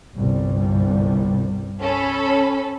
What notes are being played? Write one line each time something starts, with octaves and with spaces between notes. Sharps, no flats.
G1 C2 G3
C#4 A4 B5